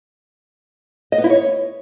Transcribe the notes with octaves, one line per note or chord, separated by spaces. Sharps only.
D#5
B3
E4
C#5